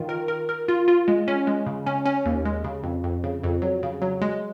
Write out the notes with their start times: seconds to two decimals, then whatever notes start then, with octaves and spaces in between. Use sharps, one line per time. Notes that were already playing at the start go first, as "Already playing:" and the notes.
Already playing: D#3 F4
0.09 A#4
0.28 A#4
0.49 A#4
0.68 F4
0.88 F4
1.08 G#3
1.28 C#4
1.47 G#3
1.66 C#3
1.86 C#4
2.06 C#4
2.26 D#2
2.45 G#3
2.64 C#3
2.84 F2
3.04 F2
3.24 C#3
3.43 F2
3.62 F#3
3.83 C#3
4.02 F#3
4.22 G#3